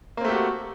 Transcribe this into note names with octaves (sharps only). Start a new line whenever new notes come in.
A3 A#3 C4 F#4 G4